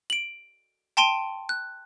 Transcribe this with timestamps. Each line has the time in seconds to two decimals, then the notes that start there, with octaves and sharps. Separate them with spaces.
0.10 D7 F#7
0.97 G5 A5 C6 D7 D#7 G7
1.49 F#6